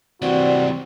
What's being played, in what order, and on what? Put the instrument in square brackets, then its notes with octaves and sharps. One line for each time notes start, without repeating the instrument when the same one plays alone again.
[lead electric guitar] E3 G3 [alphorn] C4 [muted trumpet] F#4 [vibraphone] D5